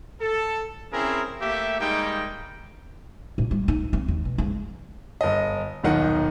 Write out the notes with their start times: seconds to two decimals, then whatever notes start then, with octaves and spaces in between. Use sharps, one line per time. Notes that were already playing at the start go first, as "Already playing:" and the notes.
0.20 A4
0.93 C4 C#4 E4 G#4 A#4
1.41 A3 A#3 G4 E5
1.80 G3 G#3 A#3 D#4 G5
3.38 A#2
3.51 G3
3.68 D#4
3.93 C4
4.08 D#2
4.25 B2
4.38 G#2
5.21 G1 D#5
5.83 D#1 B1 D#3 D#4 F#5